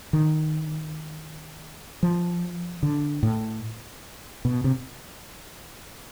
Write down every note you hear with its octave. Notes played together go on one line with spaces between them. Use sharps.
D#3
F3
D3
A2
B2
C3